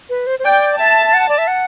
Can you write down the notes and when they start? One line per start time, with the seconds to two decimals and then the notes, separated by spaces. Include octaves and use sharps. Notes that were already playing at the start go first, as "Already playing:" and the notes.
0.09 B4
0.27 C5
0.39 C5
0.45 D5 G5
0.79 E5 A5
1.14 F#5
1.29 D5
1.38 E5
1.47 F#5